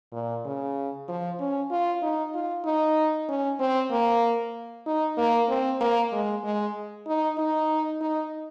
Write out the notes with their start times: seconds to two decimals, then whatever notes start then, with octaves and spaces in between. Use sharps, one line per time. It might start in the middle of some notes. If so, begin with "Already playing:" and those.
0.13 A#2
0.46 C#3
1.08 F3
1.40 C#4
1.71 F4
2.02 D#4
2.35 F4
2.65 D#4
3.29 C#4
3.60 C4
3.91 A#3
4.87 D#4
5.18 A#3
5.49 C4
5.81 A#3
6.13 G#3
6.44 G#3
7.07 D#4
7.38 D#4
8.01 D#4